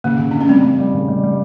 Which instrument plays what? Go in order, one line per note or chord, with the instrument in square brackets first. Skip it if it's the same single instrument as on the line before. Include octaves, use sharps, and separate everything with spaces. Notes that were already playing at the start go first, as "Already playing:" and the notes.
[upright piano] C#3 [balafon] A#3
[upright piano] C#3
[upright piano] C#3 [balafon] D4
[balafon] C#4
[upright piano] G3 [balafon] C4
[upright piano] G3
G3
C#3
G3
G3